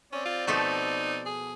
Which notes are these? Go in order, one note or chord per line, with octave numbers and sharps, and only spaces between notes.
C4 C#4 D5
F4
B2 F3 A3 D#4
G#4